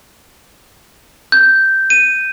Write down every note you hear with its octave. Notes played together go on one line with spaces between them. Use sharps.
G6
D#7